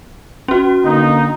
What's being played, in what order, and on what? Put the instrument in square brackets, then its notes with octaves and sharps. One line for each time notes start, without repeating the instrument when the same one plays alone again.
[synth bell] C#4 F#4
[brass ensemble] D3 A#3 D#4